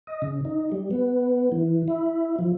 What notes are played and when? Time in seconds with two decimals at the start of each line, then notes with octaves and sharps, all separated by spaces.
0.07 D#5
0.22 C#3
0.45 D#4
0.72 G3
0.91 B3
1.52 E3
1.88 E4
2.39 F3